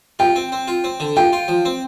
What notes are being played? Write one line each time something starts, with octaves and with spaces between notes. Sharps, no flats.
F4 G5
C4
C4
F4
C4
D3
F4 G5
F4
F3
C4